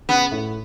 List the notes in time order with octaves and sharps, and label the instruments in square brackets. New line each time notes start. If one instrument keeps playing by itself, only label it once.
[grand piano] C#3 [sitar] B3
[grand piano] A2